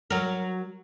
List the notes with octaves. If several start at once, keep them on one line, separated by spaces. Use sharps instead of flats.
F#3 A#4